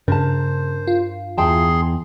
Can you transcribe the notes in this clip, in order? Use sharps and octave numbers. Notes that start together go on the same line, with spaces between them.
G2 C#3 A#4 C5 A5
F4
E2 G#4 G5 A5 C6